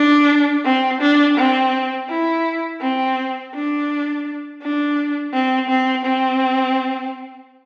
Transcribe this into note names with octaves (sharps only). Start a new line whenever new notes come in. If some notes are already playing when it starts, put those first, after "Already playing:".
Already playing: D4
C4
D4
C4
E4
C4
D4
D4
C4
C4
C4